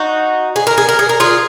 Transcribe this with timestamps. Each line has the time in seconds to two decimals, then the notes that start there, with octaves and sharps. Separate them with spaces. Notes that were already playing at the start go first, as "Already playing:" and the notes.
Already playing: D#4 F#4
0.56 G#4
0.67 A#4
0.78 G#4
0.89 A#4
0.99 G#4
1.09 A#4
1.20 F4 G#4